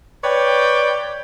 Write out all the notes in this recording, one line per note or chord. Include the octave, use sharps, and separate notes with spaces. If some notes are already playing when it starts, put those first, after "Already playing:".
B4 C#5 D5 G5